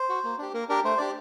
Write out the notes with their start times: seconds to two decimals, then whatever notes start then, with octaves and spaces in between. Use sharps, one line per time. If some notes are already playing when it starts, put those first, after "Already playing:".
Already playing: C5
0.09 F#4
0.24 A#3
0.38 D4 G4
0.54 A#3 A#4
0.69 D4 G4 A#4
0.84 A3 C5
0.98 D4 G4 D5